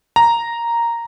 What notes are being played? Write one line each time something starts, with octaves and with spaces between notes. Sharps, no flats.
A#5